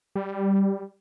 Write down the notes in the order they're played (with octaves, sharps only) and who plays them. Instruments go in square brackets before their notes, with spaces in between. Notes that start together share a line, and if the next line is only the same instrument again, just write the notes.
[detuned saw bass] G3